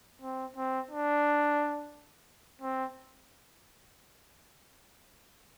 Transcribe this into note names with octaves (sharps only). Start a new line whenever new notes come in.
C4
C4
D4
C4